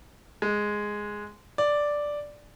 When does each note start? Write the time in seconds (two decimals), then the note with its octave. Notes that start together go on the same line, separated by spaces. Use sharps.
0.42 G#3
1.58 D5